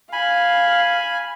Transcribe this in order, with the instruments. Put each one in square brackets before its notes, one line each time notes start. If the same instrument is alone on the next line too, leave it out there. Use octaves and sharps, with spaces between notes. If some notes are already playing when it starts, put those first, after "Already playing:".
[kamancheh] F5 [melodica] G#5 B5